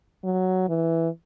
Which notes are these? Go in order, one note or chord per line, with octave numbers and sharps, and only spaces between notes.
F#3
E3